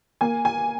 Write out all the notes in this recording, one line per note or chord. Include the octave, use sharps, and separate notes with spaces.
A#3 G#5
G#5